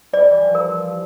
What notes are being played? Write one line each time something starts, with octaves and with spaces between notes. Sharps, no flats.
G3 D5
E3
F3
A#4
F3